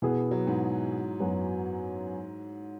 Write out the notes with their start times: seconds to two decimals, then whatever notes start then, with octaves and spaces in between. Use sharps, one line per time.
0.02 B2 E3 B3 G#4
0.31 F#3
0.47 G#2
1.20 F#2 F#3 B3 F#4